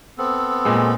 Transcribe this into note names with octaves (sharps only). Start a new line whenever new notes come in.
B3 C4 A4
A#2 G#3